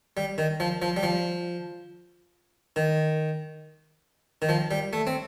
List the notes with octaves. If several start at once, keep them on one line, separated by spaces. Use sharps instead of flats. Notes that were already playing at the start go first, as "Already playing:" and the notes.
G3
D#3
F3
F3
G3
F3
D#3
D#3
F3
G3
A3
C4